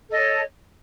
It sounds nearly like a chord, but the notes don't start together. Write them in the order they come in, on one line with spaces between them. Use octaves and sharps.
A4 D#5 C#5